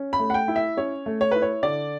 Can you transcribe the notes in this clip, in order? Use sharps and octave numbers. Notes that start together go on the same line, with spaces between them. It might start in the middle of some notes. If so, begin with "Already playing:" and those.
Already playing: C#4
B5
A3
F#5
G5
E4
E5
C#4 C#5
A3
C#5
E4 B4
C#5
D3 D5